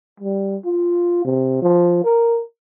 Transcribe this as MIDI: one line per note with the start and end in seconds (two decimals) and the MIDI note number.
0.20 0.57 55
0.65 1.23 65
1.25 1.60 48
1.62 2.04 53
2.04 2.41 70